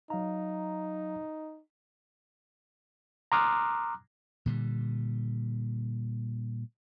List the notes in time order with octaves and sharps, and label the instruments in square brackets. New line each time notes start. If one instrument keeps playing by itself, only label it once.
[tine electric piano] F#3 F5 A#5 [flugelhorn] D#4
[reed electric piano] A#5 C6 D6 D#6 F6 F#6
[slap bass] A#2 D3 G3